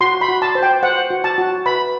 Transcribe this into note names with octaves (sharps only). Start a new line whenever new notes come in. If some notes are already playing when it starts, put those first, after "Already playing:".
F#4 C6
B5
F#4
A5
C5
G5
C5 F#5
F#4
A5
F#4
B4 B5